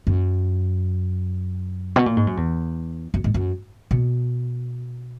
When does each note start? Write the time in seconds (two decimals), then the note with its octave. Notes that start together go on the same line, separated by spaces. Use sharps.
0.07 F#2
1.96 B2
2.06 A#2
2.17 G#2
2.27 F#2
2.37 E2
3.14 F#2
3.24 G#2
3.34 F#2
3.91 B2